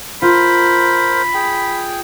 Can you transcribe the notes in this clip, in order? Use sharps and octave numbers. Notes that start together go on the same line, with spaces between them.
F4 A#4 C5 B5
G#4 G5